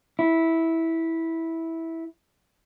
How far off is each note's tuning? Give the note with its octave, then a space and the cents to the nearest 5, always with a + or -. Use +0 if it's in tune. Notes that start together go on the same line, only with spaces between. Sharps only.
E4 -10